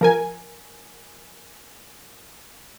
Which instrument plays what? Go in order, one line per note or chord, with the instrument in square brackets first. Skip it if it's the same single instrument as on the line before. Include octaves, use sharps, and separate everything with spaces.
[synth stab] F3 A#4 G#5